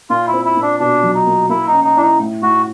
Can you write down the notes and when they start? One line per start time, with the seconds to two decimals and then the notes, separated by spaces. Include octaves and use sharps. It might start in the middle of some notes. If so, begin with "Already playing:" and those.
0.10 A#2 F4
0.27 E4
0.33 C4
0.45 E4
0.57 A#2
0.62 D4
0.80 B2 D4
1.03 F#3
1.15 D#4
1.27 A#3
1.49 A#3 E4
1.67 D#4
1.72 C#4
1.84 D#4
1.97 D4 E4
2.02 D#4
2.20 A2
2.42 A2 F#4